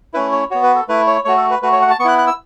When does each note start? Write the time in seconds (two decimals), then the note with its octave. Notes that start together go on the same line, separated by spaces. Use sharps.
0.14 A3 C#4 E4 B4
0.32 C#5
0.51 B3 F#4 C#5
0.63 B4
0.75 A4
0.88 A3 E4 B4
1.07 C#5
1.25 A3 F#4 C#5
1.37 A4
1.51 B4
1.62 A3 F#4 B4
1.72 C#5
1.82 F#5
1.90 A5
2.00 B3 C#6
2.05 E4 F#6
2.18 F#6
2.27 E6